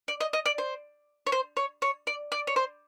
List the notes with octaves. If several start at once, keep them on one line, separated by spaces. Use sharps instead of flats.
D5
D#5
D#5
D5
C5
C#5
C5
C#5
C#5
D5
D5
C#5
C5